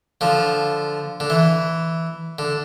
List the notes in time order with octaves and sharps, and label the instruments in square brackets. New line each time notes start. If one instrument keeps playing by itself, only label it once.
[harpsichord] D3 F3
D3
E3
D3